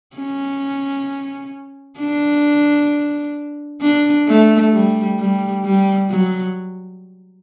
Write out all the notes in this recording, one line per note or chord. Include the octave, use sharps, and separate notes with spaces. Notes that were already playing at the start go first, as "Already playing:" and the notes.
C#4
D4
D4
A3
G3
G3
G3
F#3